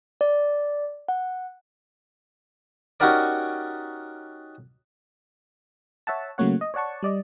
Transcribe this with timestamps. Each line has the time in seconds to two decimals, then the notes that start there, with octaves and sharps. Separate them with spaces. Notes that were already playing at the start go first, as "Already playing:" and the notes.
0.21 D5
1.08 F#5
3.00 C#4 D#4 F#4 G4 A#4 D5
6.07 C#5 E5 F#5 A5
6.38 C#3 F#3 A3 A#3 C#5 F#5
6.61 D#5
6.74 C#5 D5 F#5 A5 C#6
7.03 G3 D5 D#5